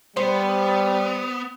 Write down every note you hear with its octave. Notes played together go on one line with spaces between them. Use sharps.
G3 B3 C5